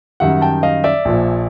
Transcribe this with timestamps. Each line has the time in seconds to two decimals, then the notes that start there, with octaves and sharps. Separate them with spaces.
0.20 F#2 D#3 G3 E5 F#5
0.41 G5 A5
0.63 D#5 F5
0.84 D5 E5
1.05 A#1 A#2 F3